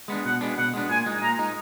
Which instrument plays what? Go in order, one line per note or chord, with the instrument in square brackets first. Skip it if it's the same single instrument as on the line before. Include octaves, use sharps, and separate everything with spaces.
[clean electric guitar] G#3 B3 D4
[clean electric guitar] B2 [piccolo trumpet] F#5
[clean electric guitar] G#3 B3 D4
[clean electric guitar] B2 [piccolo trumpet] F#5
[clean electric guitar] G#3 B3 D4
[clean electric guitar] A#2 [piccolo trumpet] G#5
[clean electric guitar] G#3 D#4
[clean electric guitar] A#2 [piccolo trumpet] A#5
[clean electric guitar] G#3 D#4